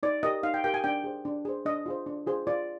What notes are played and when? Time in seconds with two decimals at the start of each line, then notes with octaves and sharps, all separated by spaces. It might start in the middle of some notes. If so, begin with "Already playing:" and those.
0.03 D#4 D5
0.23 G4 A#4 D#5
0.43 D#4 F5
0.54 G5
0.64 G4 A#4 G5
0.74 G#5
0.84 D4 G5
1.04 G#4 C5
1.25 D4
1.45 G#4 C5
1.65 D4 D#5
1.86 F4 G#4 C5
2.06 D4
2.27 F4 G#4 C5
2.47 F4 D5